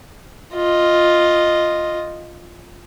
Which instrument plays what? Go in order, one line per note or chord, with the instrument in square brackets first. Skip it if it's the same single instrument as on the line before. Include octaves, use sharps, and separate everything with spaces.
[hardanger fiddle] F4 D#5